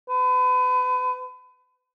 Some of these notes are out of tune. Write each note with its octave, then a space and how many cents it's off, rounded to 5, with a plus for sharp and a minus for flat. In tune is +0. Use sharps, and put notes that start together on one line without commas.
B4 +35